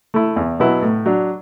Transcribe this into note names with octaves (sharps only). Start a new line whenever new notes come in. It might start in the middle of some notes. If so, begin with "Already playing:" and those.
A3 E4
E2
B2 F#3 B3 E4
A2
F#3 D4